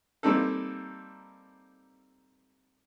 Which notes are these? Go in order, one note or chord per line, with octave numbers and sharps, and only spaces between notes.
G3 A#3 C4 D#4 A4